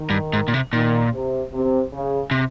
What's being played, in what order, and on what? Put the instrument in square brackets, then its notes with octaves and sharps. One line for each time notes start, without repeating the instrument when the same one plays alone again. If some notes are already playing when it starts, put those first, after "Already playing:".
Already playing: [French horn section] D#3
[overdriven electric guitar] G2
G#2
A#2
C3
[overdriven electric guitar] A#2 [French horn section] D#3
[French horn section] C3
C3
C#3
[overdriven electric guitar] C3